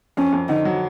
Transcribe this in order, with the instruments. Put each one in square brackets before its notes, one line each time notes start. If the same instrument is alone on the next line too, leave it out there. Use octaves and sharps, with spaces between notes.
[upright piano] F2 [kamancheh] C#4
[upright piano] F2
[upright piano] D3 [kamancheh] D#4
[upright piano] F#3